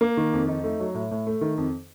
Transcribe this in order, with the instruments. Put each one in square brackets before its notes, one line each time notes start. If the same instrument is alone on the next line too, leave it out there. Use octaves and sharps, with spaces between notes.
[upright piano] A#3
D#3
F2
D#4
A3
F#3
A2
A2
A3
D#3
F2